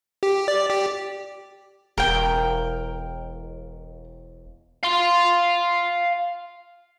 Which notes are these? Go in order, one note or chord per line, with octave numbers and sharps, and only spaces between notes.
G4
D5
G4
E1 A#4 G5
F5 C6